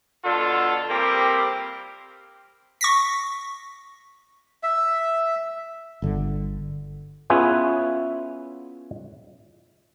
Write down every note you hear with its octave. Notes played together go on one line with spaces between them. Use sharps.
B2 D3 F4 A4
G3 A#3 C4 G4
C#6 A#6 B6
E5
G1 D3
B3 C#4 E4 F4 G#4 B4